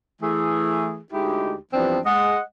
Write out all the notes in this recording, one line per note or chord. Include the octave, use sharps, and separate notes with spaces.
E3 A3 G#4
D2 G#3 D#4 E4 G4
G2 E3 F3 B3 C4 D4
G#3 D#5 F#5